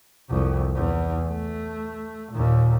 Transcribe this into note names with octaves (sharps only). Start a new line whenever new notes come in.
C2 F2
E2
A3
D#2 A#2